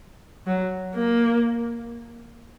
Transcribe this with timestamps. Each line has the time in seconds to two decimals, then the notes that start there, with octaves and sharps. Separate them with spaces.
0.47 F#3
0.95 A#3